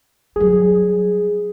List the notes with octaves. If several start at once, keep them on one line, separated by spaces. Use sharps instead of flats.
F#3 G3 G#4